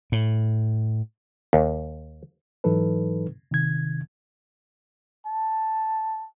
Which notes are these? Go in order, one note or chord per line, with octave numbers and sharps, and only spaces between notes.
A2
D#2
G#2 E3 F#3 D#4 A4 B4
C3 D#3 G#6
A5